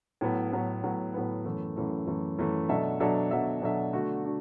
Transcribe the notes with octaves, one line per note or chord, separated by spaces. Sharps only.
A2 F#3 B3
A2 F#3 B3
A2 F#3 B3
A2 F#3 B3
F#2 E3 A3
F#2 E3 A3
F#2 E3 A3
F#2 E3 A3
B2 F#3 D4 A4 E5
B2 F#3 D4 A4 E5
B2 F#3 D4 A4 E5
B2 F#3 D4 A4 E5
D3 A3 D4 F#4
D4 F#4